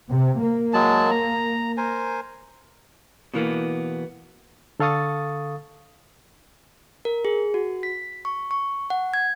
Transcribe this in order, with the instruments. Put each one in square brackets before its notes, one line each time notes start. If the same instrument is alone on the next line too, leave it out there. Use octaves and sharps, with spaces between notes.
[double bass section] C3
A#3
[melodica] F#3 G#3 A5
A#5
A#4 C5 G#5
[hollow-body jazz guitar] B2 E3 A#3 B3
[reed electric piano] D3 A4 F5 C#6 D#6 A6
[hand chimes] A#4
G#4
F#4
B6
C#6
C#6
F#5
G#6